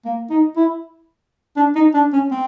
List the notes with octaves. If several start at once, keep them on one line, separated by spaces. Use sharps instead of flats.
A#3
D#4
E4
D4
D#4
D4
C#4
C4